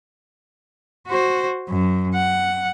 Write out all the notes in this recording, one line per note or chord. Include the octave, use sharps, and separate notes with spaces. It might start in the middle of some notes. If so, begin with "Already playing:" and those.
F#4 C5
F#2
F#5